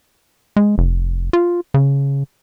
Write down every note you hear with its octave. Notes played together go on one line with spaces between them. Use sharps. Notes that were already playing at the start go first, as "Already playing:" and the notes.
G#3
F1
F4
C#3